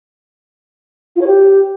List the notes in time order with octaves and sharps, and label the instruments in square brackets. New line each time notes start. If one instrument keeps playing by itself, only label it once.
[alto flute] F4
C#5
G4